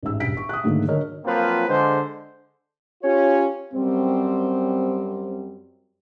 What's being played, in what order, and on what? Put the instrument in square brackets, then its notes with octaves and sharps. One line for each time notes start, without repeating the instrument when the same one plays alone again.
[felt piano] A1 G#2 E6
E1 G2 B6 D7
C#6
D#6 F#6
G#2 D3 D#3 F#3 A3 A#3
D3 F#3 A#4 C#5 D#5 F6
[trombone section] F3 F#3 A#3 C4 F4 B4
D3 G#3 C5
[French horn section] C#4 F4 G4 [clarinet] C#5
[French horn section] F#2 G3 C4